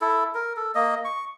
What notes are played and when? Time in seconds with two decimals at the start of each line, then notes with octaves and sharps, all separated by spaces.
0.01 E4 A4
0.35 A#4
0.56 A4
0.75 A#3 D#5
1.05 C#6